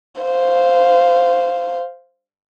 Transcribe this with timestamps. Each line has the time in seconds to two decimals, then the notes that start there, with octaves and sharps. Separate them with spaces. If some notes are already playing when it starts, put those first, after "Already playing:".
0.21 C5 F5